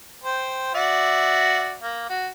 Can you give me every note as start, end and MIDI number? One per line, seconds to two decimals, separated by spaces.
0.24 0.71 72
0.24 0.71 79
0.74 1.76 66
0.74 1.76 74
0.74 1.76 76
1.82 2.08 58
2.09 2.28 66